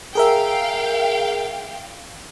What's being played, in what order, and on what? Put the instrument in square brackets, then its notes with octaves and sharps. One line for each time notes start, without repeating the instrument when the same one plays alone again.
[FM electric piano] G#4 A#4 E5 [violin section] F5 G5